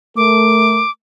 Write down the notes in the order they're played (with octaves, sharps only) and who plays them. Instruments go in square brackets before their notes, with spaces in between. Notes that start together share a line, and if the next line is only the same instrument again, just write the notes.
[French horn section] A3 A#4 [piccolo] D6